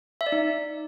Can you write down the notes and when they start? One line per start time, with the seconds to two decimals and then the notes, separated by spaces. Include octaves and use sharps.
0.21 E5
0.26 D5
0.32 D#4